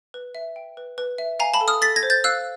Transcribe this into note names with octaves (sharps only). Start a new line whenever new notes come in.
B4
E5
G5
B4
B4
E5
F5 G#5 A#5
A5 B5
A4
D#6 F6
A4 A6 B6
G#6 A#6
C5
G6 A6
F5 E6 F#6